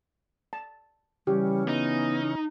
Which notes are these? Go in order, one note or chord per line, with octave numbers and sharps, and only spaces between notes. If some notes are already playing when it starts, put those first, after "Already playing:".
A5
C#3 E3 G3 C#4 G4
B3 D#4